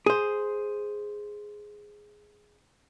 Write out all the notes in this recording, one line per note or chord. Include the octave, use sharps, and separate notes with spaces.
G#4 C5